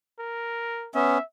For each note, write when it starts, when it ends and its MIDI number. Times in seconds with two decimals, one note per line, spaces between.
0.19 0.89 70
0.95 1.18 59
0.95 1.18 61
0.95 1.23 76